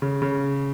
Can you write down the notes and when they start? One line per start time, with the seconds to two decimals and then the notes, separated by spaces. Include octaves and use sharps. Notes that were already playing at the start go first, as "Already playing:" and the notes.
0.02 C#3
0.22 C#3